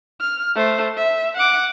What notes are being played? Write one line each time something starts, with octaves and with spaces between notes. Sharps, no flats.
F6
A3 C5
E5
F#5 D6